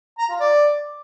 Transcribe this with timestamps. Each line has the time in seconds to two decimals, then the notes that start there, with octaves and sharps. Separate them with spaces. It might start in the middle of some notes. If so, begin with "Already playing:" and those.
0.19 A#5
0.29 F4
0.40 D5